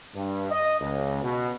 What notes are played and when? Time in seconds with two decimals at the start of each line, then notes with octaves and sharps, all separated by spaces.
0.14 G2
0.51 D#5
0.81 C#2
1.23 B2